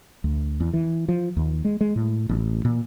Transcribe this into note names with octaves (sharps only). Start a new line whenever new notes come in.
D2
E2
E3
F3
D#2
G#3
G#3
A2
A1
A#2